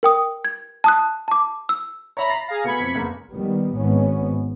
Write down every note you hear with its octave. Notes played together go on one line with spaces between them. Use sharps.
A#4 G5 D#6
G#6
A5 D#6 F#6
A5 D6
E6
C#5 E5 A#5 B5
A6 C7
G#4 F5 A#5
B2 A3 B3 B5 G#6 C#7
F2
F#1 A#3 B3
D#3 G3 B3
G#1 G#2 B3 C#4